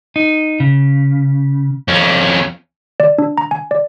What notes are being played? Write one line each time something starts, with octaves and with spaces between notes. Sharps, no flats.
D#4
C#3
F2 C#4
D5
D4
A#5
G#5
D5